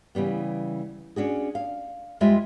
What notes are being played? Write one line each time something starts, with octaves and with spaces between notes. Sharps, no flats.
C#3 E3 G3 B3
C#4 D4 F#4 G#4
F5
F2 G3 G#3 F4 E5